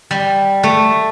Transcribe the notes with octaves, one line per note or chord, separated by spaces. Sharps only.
G3
A3